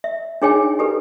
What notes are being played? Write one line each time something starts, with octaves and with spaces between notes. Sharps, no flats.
E5
D4 D#4 G#4 C#5 G5 G#5
G4 A4 B4